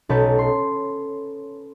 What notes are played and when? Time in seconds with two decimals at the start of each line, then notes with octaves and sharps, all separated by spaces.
0.09 B1 B2 C#4 A4 B4 G6
0.38 C6